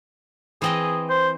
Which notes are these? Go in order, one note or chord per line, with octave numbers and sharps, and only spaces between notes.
E3 C4 G#4 D#5
C5